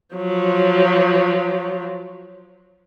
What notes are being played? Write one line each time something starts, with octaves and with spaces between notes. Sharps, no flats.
F3 F#3